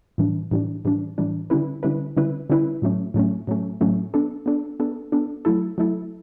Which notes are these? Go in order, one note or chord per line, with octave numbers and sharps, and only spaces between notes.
A2 E3 G3 D4
A2 E3 G3 D4
A2 E3 G3 D4
A2 E3 G3 D4
D3 G3 C#4 E4 B4
D3 G3 C#4 E4 B4
D3 G3 C#4 E4 B4
D3 G3 C#4 E4 B4
A2 F#3 A3 C#4
A2 F#3 A3 C#4
A2 F#3 A3 C#4
A2 F#3 A3 C#4
B3 D4 A4
B3 D4 A4
B3 D4 A4
B3 D4 A4
F#3 A3 E4 A4
F#3 A3 E4 A4